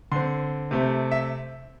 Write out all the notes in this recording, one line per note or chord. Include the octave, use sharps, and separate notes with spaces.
D3 C4 C6
C3 A3 C4
E5